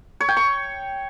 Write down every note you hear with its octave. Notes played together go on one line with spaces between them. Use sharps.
C#5
G5
C#6